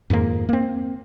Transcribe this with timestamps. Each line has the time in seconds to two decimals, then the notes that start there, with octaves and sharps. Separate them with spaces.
0.10 F2 G#2 D#3 A#3
0.49 A#3 C4